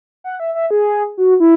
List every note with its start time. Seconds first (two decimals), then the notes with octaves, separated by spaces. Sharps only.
0.24 F#5
0.40 E5
0.55 E5
0.71 G#4
1.18 F#4
1.40 E4